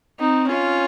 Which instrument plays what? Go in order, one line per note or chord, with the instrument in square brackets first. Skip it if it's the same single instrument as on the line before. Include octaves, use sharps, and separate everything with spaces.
[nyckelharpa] C4 [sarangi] D#4
[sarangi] C#4 [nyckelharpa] F4